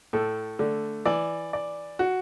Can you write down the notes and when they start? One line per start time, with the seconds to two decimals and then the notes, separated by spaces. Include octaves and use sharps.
0.13 A2 A4
0.59 D3 A3
1.06 E3 D5
1.53 D5
1.99 F#4